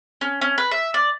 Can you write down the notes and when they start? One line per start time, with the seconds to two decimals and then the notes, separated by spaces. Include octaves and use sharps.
0.21 C#4
0.41 C#4
0.58 B4
0.71 E5
0.94 D5